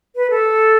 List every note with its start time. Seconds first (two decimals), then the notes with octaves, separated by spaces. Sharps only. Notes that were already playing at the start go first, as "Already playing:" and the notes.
0.16 B4
0.30 A4